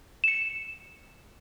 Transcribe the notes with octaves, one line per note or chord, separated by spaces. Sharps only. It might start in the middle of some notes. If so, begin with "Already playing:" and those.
C#7 E7